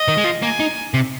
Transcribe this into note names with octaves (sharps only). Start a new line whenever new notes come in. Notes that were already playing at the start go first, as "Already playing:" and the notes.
Already playing: D#5
D#3
G#3
F3
A#3 G#5
D#4
C3